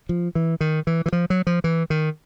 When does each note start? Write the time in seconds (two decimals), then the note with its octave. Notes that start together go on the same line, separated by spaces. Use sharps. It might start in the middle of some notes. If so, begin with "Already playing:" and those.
0.09 F3
0.35 E3
0.61 D#3
0.87 E3
1.06 E3
1.12 F3
1.30 F#3
1.47 F3
1.64 E3
1.90 D#3